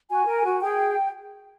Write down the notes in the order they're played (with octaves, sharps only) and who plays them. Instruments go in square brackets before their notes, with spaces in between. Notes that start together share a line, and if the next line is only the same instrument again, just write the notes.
[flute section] F#4 G#5
A#4
F#4
G#4 G5